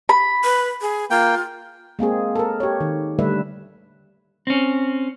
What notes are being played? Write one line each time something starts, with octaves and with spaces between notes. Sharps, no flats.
B5
B4
G#4
A#3 F4 G5
G#3 A#3 C4 G#4
A4 A#4
G4 C#5
D#3
D3 G3 A3 B4 E5
C4 C#4